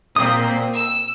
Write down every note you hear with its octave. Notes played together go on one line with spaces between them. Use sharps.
A#2 A#3 C4 D#6
E6